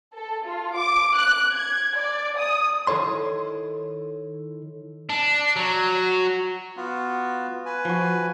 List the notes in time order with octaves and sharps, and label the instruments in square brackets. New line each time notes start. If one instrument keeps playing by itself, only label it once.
[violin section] A4
F4
D6
F#6
G#6
D5
D#6
[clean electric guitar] D#3 E4 A4 C#5 C6
[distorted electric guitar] D4
F#3
[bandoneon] B3 F4 F#4
B4 G#5
[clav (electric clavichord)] F3 F#4